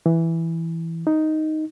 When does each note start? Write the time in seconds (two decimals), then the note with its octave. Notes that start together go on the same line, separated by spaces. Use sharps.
0.06 E3
1.07 D#4